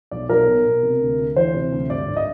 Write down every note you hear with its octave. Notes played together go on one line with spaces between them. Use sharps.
B1 D5
B1 A#4
B2
B2
C3
D2
D2
E3 C5
C3
D2
G2 D5
G#1
D#5